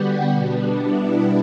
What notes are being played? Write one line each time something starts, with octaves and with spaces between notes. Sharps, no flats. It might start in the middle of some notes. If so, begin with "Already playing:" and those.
Already playing: D3 G3 B3 F#4 G4
B2 G3 B3 D4
E4